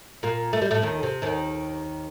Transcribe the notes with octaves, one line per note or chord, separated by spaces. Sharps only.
A#2 A#3
A3
G3
A2 A3
D#2 D#3
C3
D#2 D#3